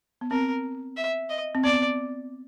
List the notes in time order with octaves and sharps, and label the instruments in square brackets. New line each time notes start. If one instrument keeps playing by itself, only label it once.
[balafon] B3
[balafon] C4 [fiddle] A#4
[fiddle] E5
D#5
[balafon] C4
[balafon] B3 [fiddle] D5